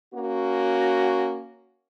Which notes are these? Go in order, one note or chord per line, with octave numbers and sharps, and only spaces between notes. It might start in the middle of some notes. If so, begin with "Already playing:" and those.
A#3 C#4 F#4